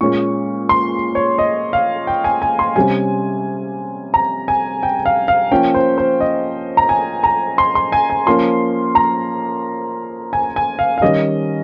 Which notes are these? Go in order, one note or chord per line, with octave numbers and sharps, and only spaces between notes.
A#2 G#3 C#4 C#6
C6
C#5
D#5
F5
G5
G#5
G#5
C6
C3 G3 C#4 G#5
A#5
G#5
G5
F5
F5
F3 A#3 C#4 G5
C5
C5
D#5
A#5
G#5
A#5
C6
C6
G#5
G#5
F3 A#3 C#4 C6
A#5
G#5
G#5
F5
F5
D#3 G3 C#4 D#5